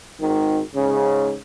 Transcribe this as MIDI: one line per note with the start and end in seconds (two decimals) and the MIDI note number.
0.20 0.62 32
0.20 0.62 44
0.20 0.62 51
0.74 1.36 44
0.74 1.36 49